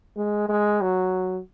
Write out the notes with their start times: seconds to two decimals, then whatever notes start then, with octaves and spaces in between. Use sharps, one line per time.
0.17 G#3
0.49 G#3
0.81 F#3